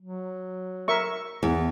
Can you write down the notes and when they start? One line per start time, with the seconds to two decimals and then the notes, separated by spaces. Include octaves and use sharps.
0.01 F#3
0.88 A#4 E5 C#6
1.43 E2 B3